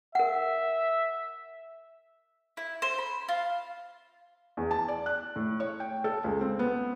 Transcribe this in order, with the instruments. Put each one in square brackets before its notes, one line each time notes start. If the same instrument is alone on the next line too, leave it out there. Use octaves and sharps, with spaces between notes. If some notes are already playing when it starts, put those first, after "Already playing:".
[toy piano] A#4 F#5 [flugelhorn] E5
[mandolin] E4
C5
B5
F4
[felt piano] E2
A5
D5
F#6
A2
C#5
G5
A4
C#2
C4
B3